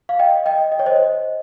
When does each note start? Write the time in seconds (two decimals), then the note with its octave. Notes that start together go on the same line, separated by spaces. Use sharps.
0.09 F5
0.19 D#5 G5
0.46 D#5 G5
0.72 D#5
0.79 C#5
0.86 C5 D#5